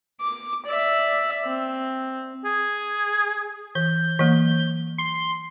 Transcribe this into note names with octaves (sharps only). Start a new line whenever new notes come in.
D6
D5 E5
C4
G#4
E3 G6
E3 F#3 A#3
C6